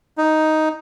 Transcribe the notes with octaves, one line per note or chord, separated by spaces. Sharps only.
D#4